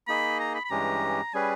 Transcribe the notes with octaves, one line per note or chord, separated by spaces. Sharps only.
A#3 D#4 G#4 D#5 B5
A#5
B5
B5
G2 E3 G#3 C#4 G4 A#5
G3 C#4 G#4 B4 G#5